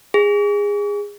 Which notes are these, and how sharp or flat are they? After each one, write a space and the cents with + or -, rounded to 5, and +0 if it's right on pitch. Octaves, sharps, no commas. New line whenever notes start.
G#4 -20